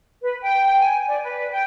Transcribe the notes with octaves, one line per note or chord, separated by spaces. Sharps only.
B4
G5
G#5
D5
B4
G5